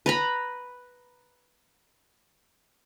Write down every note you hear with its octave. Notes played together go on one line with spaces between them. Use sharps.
B4 A#5 B5